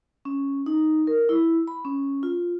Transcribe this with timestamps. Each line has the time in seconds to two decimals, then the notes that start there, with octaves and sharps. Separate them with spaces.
0.25 C#4
0.66 D#4
1.07 A#4
1.29 E4
1.68 B5
1.85 C#4
2.23 F4